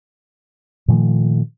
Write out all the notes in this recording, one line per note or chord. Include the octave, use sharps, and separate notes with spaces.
A#2 D#3 F3 A3